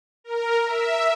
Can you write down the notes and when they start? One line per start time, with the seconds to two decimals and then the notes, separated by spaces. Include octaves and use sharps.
0.24 A#4
0.65 E5